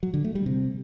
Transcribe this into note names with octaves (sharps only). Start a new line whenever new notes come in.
F#3
D3
A3
G3
C3